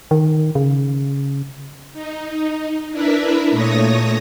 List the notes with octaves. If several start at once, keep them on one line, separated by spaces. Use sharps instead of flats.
D#3
C#3
D#4
D4 E4 A#4 B4 E5
A#2 A3 C#5 D#6 A#6